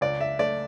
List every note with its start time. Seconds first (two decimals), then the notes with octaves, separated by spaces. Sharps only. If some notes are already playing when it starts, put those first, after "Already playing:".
0.01 C#2 D5
0.21 E5
0.39 A3 D5